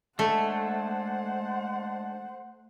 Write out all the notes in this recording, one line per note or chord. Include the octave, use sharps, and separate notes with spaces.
G#3 A3 D4 A4 C5 F#5